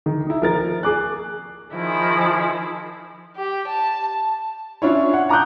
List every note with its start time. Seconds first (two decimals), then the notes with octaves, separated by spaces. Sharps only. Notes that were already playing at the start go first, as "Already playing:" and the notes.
0.06 D#3
0.27 D#4 E4
0.42 F3 A#4 A6
0.83 G#4 D6 F#6
1.74 D#3 F3 E4 G#4
3.36 G4
3.67 A5
4.82 C#4 D4 E4 F4 C#5
5.13 F#5
5.29 A5 A#5 D6 D#6 F#6 G6